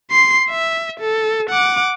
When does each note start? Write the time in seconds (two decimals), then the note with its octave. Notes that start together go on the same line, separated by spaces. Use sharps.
0.11 C6 C7
0.50 E5
1.00 A4
1.50 F#5 D6